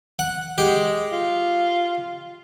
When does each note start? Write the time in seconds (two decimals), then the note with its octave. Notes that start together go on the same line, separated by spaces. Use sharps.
0.19 F#5
0.58 G#3 G4
1.12 F4